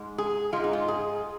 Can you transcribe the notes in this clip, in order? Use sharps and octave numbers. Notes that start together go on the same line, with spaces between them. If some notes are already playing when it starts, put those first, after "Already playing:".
Already playing: G#2 G#3
G#4
G#2 G#3 F4
D#4
F4
G#4